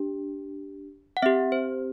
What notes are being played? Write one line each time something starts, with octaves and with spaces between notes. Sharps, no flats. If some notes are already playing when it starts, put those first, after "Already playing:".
Already playing: D4 G4
F#5
C4 G4 E5
C5